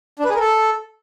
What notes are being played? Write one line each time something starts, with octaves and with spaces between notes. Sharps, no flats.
D4
B4
G#4
A#4
A4